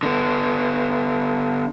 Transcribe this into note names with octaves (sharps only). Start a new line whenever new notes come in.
D3 B3